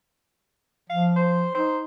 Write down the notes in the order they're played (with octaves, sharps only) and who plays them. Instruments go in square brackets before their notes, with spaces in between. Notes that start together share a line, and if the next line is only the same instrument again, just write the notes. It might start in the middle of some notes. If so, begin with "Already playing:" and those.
[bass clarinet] F3 [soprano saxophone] F5
[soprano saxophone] C5
[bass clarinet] D#4 [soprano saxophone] C5